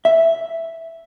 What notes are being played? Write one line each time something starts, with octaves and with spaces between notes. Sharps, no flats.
E5